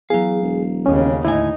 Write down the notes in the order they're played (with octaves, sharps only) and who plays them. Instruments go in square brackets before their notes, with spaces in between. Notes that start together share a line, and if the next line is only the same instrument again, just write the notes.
[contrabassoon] E2 [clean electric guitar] F#3 F5 [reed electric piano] G#4
[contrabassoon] E1
[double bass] D#2 C#3 [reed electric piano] C#4
[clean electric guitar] D2 A2 G#5 [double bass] D#4 [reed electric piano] E4